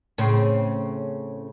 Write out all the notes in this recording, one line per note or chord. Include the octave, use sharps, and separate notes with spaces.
A2 C#3 C4